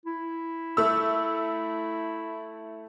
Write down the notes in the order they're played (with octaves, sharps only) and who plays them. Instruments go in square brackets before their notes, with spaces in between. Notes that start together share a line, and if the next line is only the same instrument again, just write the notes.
[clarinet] E4
[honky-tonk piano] A3 E6